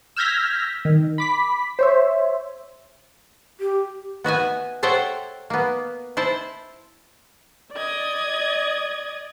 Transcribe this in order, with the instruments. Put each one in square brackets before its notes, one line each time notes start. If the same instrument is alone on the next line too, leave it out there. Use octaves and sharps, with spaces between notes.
[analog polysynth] E6 F6 G6 G#6 A#6 B6
D#3
B5 D6 B6
C5 C#5 E5
[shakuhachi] G4
[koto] B3 F#4 E5 G#5
A4 C5 C#5 E5 F#5 G5
A#3 B3
E4 C5 A5
[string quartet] D5 D#5 G#6